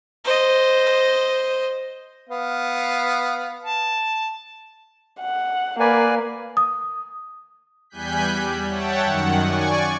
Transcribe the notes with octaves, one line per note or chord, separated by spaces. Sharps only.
C5 D#5
B3 F5
A5
F#5
A#3 B4 D5 G#5
D#6
E2 G3 G#5 F#6 G6 B6
G3
C#5 E5 F#5 G5 A5
F#2 D#3 F#5
D5 G#5 C#6